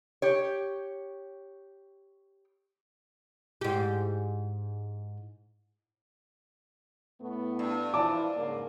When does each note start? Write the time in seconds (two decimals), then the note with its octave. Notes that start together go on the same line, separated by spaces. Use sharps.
0.22 G4 C#5
3.61 G#2 G4
7.21 A2 A3 B3
7.59 G2
7.94 E3 F3 D5 A5 D6
8.35 G#2 C#3 A#3